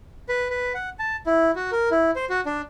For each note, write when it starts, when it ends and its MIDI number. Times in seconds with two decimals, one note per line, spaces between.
0.29 0.48 71
0.50 0.73 71
0.74 0.89 78
0.99 1.16 81
1.26 1.51 64
1.55 1.71 66
1.72 1.89 70
1.91 2.11 64
2.16 2.25 72
2.30 2.41 66
2.46 2.61 62